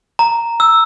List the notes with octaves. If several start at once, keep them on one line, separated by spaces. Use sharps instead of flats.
A#5
E6